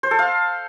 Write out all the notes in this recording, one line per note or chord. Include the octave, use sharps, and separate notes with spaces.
C5
A4
F5